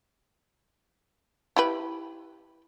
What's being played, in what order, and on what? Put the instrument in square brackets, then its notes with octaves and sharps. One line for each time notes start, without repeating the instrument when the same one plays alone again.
[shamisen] E4 G4 B4